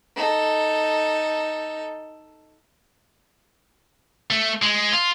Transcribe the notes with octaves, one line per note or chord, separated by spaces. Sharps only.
D#4 A4
A3
G#3
F4